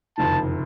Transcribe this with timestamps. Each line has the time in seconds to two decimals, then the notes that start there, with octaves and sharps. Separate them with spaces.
0.18 F#1 F2 C3 D#3 A5